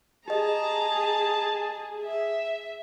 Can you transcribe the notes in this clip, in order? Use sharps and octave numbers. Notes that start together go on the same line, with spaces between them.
G4 G#4 D#5 A5 A#5
E5